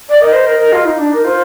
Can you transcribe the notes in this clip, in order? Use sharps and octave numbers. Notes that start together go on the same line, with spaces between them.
D5
A#4 D#5
C5
A#4
A#4
F4
D#4
D4
D#4 A#4
F4 C5